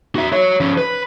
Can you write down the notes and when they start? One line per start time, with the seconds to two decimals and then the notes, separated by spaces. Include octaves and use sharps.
0.15 F#4 E5
0.32 F#4 C#5
0.60 F3 C#4
0.78 B4